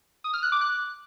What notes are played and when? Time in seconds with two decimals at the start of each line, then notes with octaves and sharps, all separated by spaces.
0.24 D#6
0.34 F6
0.43 F#6
0.52 D6
0.61 F#6